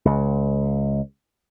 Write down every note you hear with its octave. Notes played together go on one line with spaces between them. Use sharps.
C#2